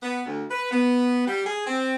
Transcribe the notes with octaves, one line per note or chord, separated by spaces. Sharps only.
B3
D2
B4
B3
G3
G#4
C4